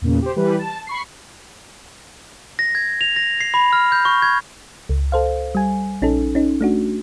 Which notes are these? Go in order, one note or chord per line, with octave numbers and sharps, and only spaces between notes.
E2 A#2 C#3
G4 C5
E3 G3 B4
A5
B5 C#6 C7
A#6
G#6
F7
A#6
C7
B5
F6
G6
C#6
G#6
C#2
A4 C5 F5
G3 G#5
A#1 C#4 D#4 A4
C#4 D#4
A3 D4 F#4